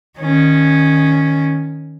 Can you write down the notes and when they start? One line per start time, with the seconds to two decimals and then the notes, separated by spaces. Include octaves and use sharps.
0.19 D#3 C#4